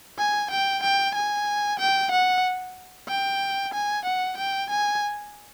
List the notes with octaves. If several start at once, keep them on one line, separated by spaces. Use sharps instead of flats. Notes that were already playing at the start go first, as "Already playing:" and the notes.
G#5
G5
G5
G#5
G5
F#5
G5
G#5
F#5
G5
G#5